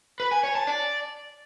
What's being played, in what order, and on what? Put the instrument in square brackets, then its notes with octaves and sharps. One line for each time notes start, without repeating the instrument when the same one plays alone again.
[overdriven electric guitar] B4
G#5
C#5
A5
D5